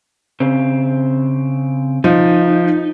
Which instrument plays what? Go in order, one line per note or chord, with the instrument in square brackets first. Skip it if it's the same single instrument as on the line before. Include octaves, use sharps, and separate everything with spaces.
[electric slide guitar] C#3 C4
[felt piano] F3 [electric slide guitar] D#4